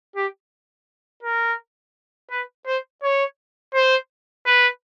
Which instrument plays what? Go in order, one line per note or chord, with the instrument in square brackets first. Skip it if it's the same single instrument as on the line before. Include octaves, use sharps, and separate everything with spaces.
[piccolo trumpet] G4
A#4
B4
C5
C#5
C5
B4